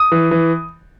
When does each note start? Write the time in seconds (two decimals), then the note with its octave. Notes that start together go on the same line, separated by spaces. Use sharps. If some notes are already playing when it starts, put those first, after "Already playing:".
Already playing: D#6
0.12 E3
0.31 E3